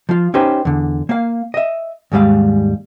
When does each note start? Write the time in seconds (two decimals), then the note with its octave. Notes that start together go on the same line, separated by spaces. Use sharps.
0.09 F3 F4
0.34 C#4 D#4 G4 B4 C5
0.65 E2 D3
1.09 A#3 F5
1.54 D#5 E5
2.12 D#2 G#2 G3 G#3 F5